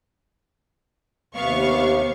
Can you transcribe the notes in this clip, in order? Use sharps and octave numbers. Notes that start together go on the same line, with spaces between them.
D#2 C3 B3 F5 C#6